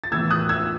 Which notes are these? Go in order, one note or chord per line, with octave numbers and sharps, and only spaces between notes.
A6
A2 E3 B3 E6 G#6
D#6 F#6
E6 G#6